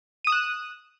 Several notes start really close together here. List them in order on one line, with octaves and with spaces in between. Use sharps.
D#7 D#6 E7 F#6